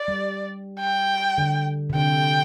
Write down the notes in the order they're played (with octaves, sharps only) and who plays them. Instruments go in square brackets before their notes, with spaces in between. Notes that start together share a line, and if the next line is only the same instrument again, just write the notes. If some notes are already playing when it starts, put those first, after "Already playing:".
Already playing: [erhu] D5
[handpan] G3
[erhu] G5
[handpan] D3
C3
[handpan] D3 [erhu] G5